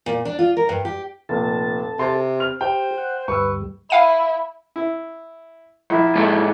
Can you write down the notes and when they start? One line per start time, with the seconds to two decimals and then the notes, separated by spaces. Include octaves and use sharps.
0.06 A#2
0.25 D4
0.39 F4
0.57 A#4
0.69 G2
0.85 G4
1.29 F1 A#2 A4 A5
1.99 C3 C6
2.40 F6 F7
2.61 G4 C5 G5
2.98 F#5
3.28 D2 G2 G3 B4 C#6 E6
3.90 E4 F5 D#7
4.76 E4
5.90 A#1 E4
6.15 G#2 A4